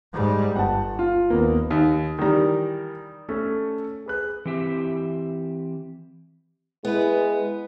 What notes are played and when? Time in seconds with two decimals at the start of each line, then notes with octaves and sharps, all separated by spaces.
0.13 G#2 G3
0.56 G1 F#5 A5
0.99 F4
1.30 D#2 A#3 B3
1.70 D#2 D#6
2.19 D#3 E3 G3 A#4 A#5
3.29 A3 C#4 A4
4.06 G#4 B4 F#6
4.45 E3 C4 G4 E5
6.85 G#3 B3 E4 B4